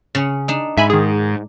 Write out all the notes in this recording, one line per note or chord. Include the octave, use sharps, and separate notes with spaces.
C#3 C#4
D4 D#4
G#2 E5 G#5 B5
D#3 G#4